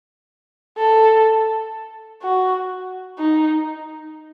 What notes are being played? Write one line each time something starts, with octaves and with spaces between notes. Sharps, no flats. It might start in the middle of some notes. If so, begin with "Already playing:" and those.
A4
F#4
D#4